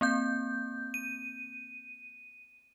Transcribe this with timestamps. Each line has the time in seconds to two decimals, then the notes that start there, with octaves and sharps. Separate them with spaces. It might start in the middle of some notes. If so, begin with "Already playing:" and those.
0.01 A#3 C4 G6
0.94 D#7